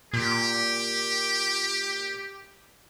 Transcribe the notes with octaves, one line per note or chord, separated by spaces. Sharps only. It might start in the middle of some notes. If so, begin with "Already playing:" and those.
A#2 G4